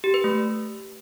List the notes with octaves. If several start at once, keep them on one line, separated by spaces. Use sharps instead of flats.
G4
B4
A3